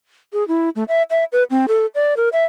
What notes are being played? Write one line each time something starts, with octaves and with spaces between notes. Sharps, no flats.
G#4
E4
A3
E5
E5
B4
C4
A4
D5
A#4
E5